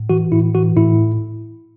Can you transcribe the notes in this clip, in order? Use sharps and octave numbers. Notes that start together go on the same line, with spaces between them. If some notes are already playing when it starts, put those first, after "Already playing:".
Already playing: A2
E3 F#4
A2 E4
E3 F#4
A2 E4